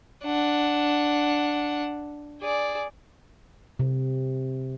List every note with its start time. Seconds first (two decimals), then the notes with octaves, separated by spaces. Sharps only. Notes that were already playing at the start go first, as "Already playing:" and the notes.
0.24 D4 F#5
2.42 G#4 D5
3.79 C3